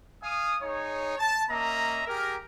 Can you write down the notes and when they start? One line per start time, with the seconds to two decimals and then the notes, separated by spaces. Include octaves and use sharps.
0.22 F5 G#5 D#6
0.62 D#4 G#4 C#5
1.18 A5
1.49 A#3 C#4 D#5 E5 A#5
2.07 G4 G#4 A#4